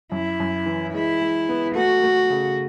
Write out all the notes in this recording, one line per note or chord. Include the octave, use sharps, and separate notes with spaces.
F#2 E4
F#2
E3
G#3 E4
G#3
B3
A3 F#4
A3
C#3